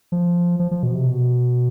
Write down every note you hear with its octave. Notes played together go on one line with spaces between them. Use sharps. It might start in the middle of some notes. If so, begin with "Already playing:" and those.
F3
F3
F3
B2
C3
B2